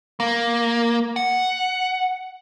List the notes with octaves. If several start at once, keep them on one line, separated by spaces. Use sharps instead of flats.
A#3
F#5